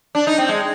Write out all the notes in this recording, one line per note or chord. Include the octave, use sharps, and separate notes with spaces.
D4
D#4
C4
G#3